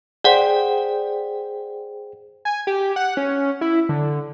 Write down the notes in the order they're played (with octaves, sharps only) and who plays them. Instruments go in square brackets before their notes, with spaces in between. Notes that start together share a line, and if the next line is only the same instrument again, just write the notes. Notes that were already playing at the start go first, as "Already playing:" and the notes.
[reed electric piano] G#4 C5 G5 [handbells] D5 F#5
[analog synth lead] G#5
G4
F#5
C#4
E4
D3